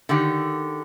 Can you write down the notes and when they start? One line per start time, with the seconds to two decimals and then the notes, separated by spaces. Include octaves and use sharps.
0.09 D3 D#3 G4